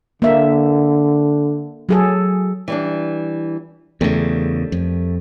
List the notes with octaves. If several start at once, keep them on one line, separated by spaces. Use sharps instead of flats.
D3 A#3 E5
F#3 G#4 A4
E3 G3 D4
E2 C#3 G3 A3 A#4
F2